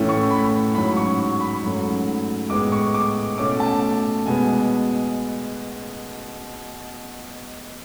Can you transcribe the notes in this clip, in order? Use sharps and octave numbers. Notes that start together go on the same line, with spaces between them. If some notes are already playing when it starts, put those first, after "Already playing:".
Already playing: A2 E3 A3 C#4
C#6
B5
G#2 F#3 C#4 B5
C#6
C#6
B5
G#2 F#3 A3 C#4
A2 G#3 B3 D6
C#6
D6
B2 A3 C#4 D6
A5
B2 G#3 B3 G#5